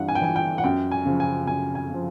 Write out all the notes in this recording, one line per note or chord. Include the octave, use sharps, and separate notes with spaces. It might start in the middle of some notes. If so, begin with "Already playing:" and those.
Already playing: G2 E3 F#5
G#5
G5
E3 G#5
G5
F#5
F#2 G5
G#5
C#3 F3
G#5
F#2 G#5
G#5
C#3 F3